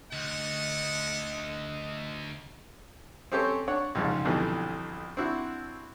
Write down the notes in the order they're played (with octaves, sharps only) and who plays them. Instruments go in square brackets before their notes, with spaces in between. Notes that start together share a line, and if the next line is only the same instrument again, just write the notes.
[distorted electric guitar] D2 [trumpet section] A4 F#5 [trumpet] D#5
[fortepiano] C4 C#4 G4 A4 C5 C#5
D4 C#5 F#5
C2 F2 G#2 C#3
B1 F2 B2 D3 E3 G3
C4 D4 E4 F#4